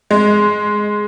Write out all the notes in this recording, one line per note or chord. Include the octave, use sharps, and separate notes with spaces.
G#3